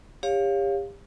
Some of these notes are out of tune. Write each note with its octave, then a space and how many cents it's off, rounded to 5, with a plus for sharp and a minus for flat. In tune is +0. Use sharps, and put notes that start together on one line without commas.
G4 +35 C#5 +0 F5 +0